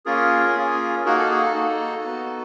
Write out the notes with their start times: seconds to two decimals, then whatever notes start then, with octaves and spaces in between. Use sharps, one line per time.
0.06 A#3 C#4 F4 G#4 A#4
0.56 A#3 C#4 F4 G#4
1.05 A#3 D#4 F#4 G#4 A#4
1.18 A4
1.31 G#4
1.43 A4
1.55 A#3 D#4 F#4
2.05 B3 D#4 F#4